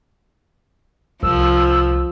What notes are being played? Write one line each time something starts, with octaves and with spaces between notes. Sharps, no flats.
C2 F3 E6